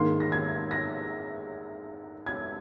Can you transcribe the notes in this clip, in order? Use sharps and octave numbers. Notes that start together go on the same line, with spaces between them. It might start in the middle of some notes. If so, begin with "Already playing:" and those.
Already playing: G#2 D#3 A#3 C6
A#6
G#6
A#6
G#6